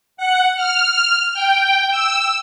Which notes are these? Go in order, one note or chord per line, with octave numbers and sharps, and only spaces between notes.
F#5
F6
G5
E6